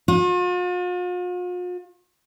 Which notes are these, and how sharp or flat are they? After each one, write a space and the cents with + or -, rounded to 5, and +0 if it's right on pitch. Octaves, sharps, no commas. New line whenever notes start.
F4 +45